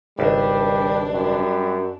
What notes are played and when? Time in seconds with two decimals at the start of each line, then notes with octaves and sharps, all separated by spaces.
0.19 G#1 C#2 G3 D4
1.11 F#2 G3